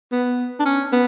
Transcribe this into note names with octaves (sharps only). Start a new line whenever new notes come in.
B3
D4
C#4
B3